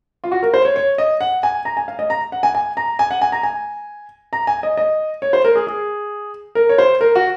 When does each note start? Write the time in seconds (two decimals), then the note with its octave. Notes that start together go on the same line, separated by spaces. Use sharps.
0.24 F4
0.32 F#4
0.43 A#4
0.54 C5
0.65 C#5
0.76 C#5
0.98 D#5
1.21 F#5
1.43 G#5
1.65 A#5
1.77 G#5
1.88 F5
1.99 D#5
2.10 A#5
2.32 F#5
2.43 G#5
2.55 G#5
2.77 A#5
2.99 G#5
3.11 F#5
3.21 G#5
3.32 A#5
3.43 G#5
4.33 A#5
4.47 G#5
4.63 D#5
4.77 D#5
5.22 C#5
5.33 C5
5.45 A#4
5.56 G#4
5.67 G#4
6.55 A#4
6.69 C#5
6.78 C5
7.01 A#4
7.15 F#4